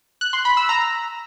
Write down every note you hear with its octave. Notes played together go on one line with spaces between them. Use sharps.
F#6
C6
B5
E6
A#5